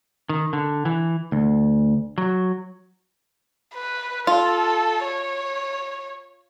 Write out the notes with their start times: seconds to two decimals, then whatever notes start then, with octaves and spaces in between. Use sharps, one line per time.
0.29 D#3
0.53 D3
0.85 E3
1.32 D2
2.18 F#3
3.75 B4
4.27 F4 A4
5.05 C#5